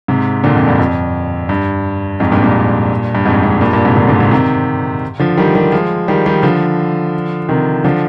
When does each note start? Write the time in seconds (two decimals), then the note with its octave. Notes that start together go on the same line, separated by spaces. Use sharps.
0.08 G#2 C3
0.44 A#2 D3
0.55 F2
0.68 G2
0.79 F2
1.49 G2
2.20 F2 G#2
2.32 G2 A#2
2.44 G2 A#2
3.15 G2
3.26 F2 G#2
3.43 F2 G#2
3.61 G2 A#2
3.73 G2 A#2
3.85 G#2 C3
3.96 A#2 D3
4.08 A#2 D3
4.20 G#2 C3
4.31 C3 D#3
5.19 D3 F3
5.37 D#3 G3
5.55 D#3 G3
5.72 F3 G#3
6.08 D#3 G3
6.26 D#3 G3
6.43 D3 F3
7.49 C3 D#3
7.84 D3 F3